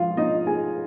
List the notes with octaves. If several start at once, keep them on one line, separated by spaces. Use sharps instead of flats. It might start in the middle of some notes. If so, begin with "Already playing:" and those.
Already playing: G#2 F3 F4 F5
F3 D#4 D#5
A3 G#4 G#5